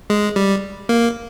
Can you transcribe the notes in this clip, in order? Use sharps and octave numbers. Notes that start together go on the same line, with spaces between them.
G#3
G3
A#3